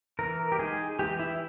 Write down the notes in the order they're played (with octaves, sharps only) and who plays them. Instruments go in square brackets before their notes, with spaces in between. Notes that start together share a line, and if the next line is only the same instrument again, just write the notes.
[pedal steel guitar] E3 A#4
G4
G#3 D#4 G#4
E3 G4
E4